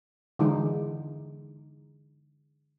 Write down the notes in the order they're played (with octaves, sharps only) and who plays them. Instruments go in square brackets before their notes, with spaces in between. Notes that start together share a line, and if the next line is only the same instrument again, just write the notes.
[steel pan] D3 E3 G#3 D#4